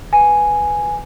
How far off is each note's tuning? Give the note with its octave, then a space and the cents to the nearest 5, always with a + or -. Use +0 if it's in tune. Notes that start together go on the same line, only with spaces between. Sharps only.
B4 +0 G#5 +0